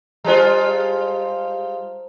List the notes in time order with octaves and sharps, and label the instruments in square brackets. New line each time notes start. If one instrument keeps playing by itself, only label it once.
[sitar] G3 G#3 F4 [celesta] C5 A5 A#5